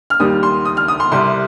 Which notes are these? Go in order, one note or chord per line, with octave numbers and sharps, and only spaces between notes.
F6
D#2 D#3 G3 D#6
C6
D#6
F6
D#6
C6
C2 C3 G3 C6